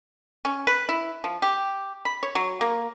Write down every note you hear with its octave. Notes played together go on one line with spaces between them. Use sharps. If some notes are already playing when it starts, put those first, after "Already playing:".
C#4
B4
E4
F3
G4
B5
C#5
F#3
A#3